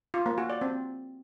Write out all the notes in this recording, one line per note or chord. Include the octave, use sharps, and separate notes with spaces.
F4
A#3
F#4
D5
C4